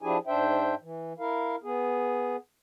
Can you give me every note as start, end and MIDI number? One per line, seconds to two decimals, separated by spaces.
0.02 0.18 53
0.02 0.18 62
0.02 0.18 64
0.02 0.18 67
0.02 0.18 68
0.02 0.18 80
0.27 0.75 44
0.27 0.75 62
0.27 0.75 72
0.27 0.75 76
0.27 0.75 79
0.82 1.13 52
1.19 1.56 64
1.19 1.56 70
1.19 1.56 77
1.63 2.36 59
1.63 2.36 68